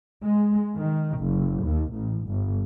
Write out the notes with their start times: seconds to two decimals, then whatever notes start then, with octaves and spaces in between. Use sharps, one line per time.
0.23 G#3
0.76 D#3
1.19 F#1
1.63 D#2
1.93 A1
2.27 G1